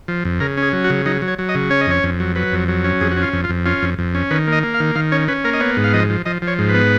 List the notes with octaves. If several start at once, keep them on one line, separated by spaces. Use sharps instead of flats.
F3
F2
C#3 A#4
C#4
G#4
F#3
F#4
C#3
F#3 D#4
F#3
C#5
F#3
D#5
C#3
C#4 C#5
D#5
F2 C#5
F2
F#3
F#3 B4
F2
F#3
C#4
F2 G#4
F#4
C#4
F4
F2
F4
F2
C#4 F4
F2
F2
C#4
D#3 B4
A#3 D#5
A#3
F5
D#3
D#3 F5
C#4 C#5
C#4 B4
A#3 A#4
D#5
B3 C#5
G#2
F5
F3 D#5
F3
F3 D#5
F3
C#5
G#2
B4
B3